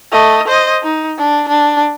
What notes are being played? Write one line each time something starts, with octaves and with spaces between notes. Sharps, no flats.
A3 D#5
C5 D#5
D#4
D4
D4